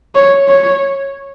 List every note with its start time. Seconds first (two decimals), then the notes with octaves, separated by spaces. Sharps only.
0.15 C#5
0.48 C#5